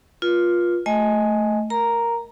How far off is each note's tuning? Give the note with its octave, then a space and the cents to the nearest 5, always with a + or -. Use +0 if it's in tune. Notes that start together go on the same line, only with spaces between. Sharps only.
F4 +5 B4 -40
A3 +0 D#5 +15 G#5 +0
A#4 +0 A#5 +0